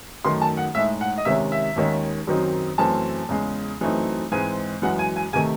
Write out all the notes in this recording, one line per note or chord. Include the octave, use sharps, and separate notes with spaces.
F#2 D#3 A3 C6
A5
F#5
A2 G#3 D#4 E5
F#5
D#5
C3 D#3 G#3 C#4 E5
E5
D#2 D#3 G#3 C#4
F#2 D#3 F#3 C4 D#4
F#2 E3 A3 C4 A5
E2 C#3 G#3
F#2 E3 A3 C4 D#4
G#2 E3 G#3 C4 G#5
F#2 E3 G#3 F#5
G#5
G#5
C3 D#3 A3 G#5